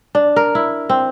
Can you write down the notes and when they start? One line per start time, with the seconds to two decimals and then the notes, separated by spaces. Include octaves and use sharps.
0.15 D4
0.36 A#4
0.55 E4
0.90 C4